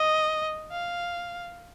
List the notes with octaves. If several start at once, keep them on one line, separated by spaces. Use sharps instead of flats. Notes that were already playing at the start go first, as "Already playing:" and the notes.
Already playing: D#5
F5